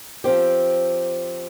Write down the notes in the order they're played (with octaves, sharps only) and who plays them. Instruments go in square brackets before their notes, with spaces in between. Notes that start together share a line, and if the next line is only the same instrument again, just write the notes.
[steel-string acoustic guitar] F3 C4 G4